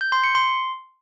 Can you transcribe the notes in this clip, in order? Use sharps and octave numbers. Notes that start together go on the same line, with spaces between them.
G6
C6
C#7
C6